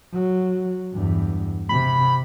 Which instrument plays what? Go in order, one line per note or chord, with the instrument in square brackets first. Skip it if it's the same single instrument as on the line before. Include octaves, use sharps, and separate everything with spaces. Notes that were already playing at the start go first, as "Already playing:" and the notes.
[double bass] F#3
E2 G2
[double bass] C3 [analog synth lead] B5